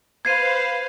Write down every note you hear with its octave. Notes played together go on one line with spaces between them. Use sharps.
B4 C5 F5 G#6 C7 D#7